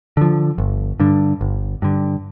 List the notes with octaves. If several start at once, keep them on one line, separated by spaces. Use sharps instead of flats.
D3 F3
G1
G2 D3
G1
G2 D3